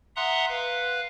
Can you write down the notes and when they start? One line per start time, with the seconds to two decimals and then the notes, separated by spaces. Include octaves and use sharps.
0.16 E5 F#5 A#5 C6 D#6 F#6
0.49 B4 F5